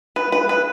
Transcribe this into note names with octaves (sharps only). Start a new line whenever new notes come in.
B4
B4
B4